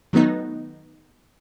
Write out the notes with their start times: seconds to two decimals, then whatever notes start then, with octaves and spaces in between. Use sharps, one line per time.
0.13 D#3 F#3 A3 B3 D#4